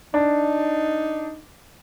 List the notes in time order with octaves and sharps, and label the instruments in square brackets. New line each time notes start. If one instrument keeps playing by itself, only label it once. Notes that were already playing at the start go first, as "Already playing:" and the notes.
[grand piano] D4 [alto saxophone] D#4